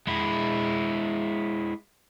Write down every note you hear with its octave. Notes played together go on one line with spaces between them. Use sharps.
G#3 E4